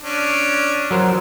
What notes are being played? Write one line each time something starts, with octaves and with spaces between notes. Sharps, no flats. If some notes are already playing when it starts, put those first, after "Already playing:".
C#4 D4
F#3 A#4 C5